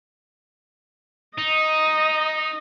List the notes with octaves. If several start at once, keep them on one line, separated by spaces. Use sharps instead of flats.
D#4 D#5